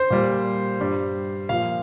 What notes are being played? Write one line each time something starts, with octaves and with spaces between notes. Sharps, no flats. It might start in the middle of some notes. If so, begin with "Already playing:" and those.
Already playing: C5
A#2 G3
G2 G3
A#2 F3 F5